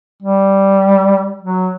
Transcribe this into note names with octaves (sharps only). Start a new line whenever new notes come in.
G3
F#3